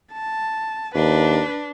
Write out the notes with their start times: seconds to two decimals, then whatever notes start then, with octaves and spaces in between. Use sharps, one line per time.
0.13 A5
0.95 D#2 D4 B4